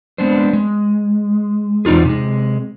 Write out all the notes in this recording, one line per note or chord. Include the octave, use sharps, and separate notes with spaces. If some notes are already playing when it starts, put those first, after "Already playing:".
G#3 B3 C4 D4 C5
G#3
E2 C4 D#4 F4 G#4
C3 G#3